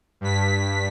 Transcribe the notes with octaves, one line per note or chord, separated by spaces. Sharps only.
G2 B6